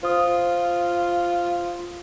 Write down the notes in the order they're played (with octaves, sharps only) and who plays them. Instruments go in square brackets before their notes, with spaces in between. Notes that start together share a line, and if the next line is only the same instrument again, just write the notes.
[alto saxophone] F4 [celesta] C5 D#6